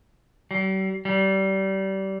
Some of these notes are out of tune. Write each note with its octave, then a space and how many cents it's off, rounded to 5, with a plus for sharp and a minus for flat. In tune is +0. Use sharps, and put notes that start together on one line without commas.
G3 -45
G3 -25